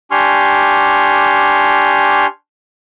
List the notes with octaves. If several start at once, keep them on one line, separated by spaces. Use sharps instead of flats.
D4 G4 G#5 C6 C#6 F6